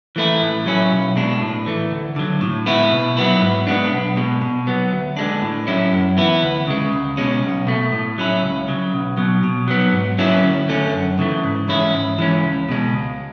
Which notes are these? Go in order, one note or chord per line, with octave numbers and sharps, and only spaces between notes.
E3 A3 E4
A2
F#3 C#4 E4
B1
B2 G#3 D4
A2
E3 A3
D2
D3 F#3
A2
G#3 B3 E4
B2
F#3 B3 E4
G#2
G#3 B3 D4
B1
B2 G#3
B2
F#3 B3
D2
D3 G#3 D4
A2
F#3 C#4 E4
F#2
E3 B3 E4
D2
C#3 G#3
C#2
B2 G#3 C#4
B1
B2 A3
A2
F#3 C#4 E4
C#2
C#3 F#3
B1
B2 F#3
B2
F#3 B3
G#2
F#3 C#4 E4
D2
D3 A3 C#4
F#2
C#3 E3 A3
G#2
E3 G#3 C#4 E4
G#2
E3 G#3 C#4
C#2
B2 G#3
C#2